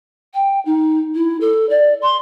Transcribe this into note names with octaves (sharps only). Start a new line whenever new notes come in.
G5
D#4
E4
A4
D5
C6